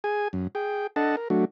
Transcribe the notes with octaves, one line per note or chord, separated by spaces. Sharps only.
G#4 G#5
F#2
G#4 G5
D4 A4 D#5 F#5 A5
A#4
F#3 A3 D4 F#4